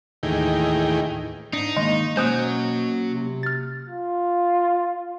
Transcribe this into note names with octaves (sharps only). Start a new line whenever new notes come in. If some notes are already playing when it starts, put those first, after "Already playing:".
D#2 A2 D#3 E3 G#4 G5
G#2 D4 D#4
D#3 G#3 A#3
B2 F#3 A#3 C#4 C5 G#5 D#6 F#6
C3
F6 A6
F4